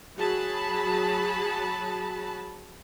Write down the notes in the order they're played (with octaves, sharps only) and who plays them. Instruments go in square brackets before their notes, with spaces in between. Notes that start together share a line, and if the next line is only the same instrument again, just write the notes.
[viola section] F#3 F#4 G#4 A5 B5